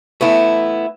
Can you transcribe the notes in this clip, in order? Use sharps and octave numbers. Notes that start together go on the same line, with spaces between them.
A3 B3 E4